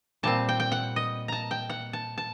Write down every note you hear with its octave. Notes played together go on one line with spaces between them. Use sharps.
A#2 G3 C4 A5
G5
G5
F#5
D#5
A5 A#5
G5
F#5
A5
A5